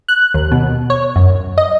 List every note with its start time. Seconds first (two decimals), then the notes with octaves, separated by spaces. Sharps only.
0.08 F#6
0.34 D#2
0.52 B2
0.90 C#5
1.16 F#2
1.58 D#5